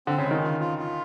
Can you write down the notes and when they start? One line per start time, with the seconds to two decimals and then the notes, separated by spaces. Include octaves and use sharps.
0.07 D3 C4
0.18 C#3
0.25 G#3
0.31 D#3
0.43 F4
0.60 F4
0.78 F4